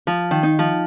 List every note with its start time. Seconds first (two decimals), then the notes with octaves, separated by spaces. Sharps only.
0.07 F3
0.31 D#3
0.43 D#4
0.59 F3